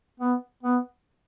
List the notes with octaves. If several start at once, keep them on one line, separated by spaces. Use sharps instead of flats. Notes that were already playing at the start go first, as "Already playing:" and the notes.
B3
B3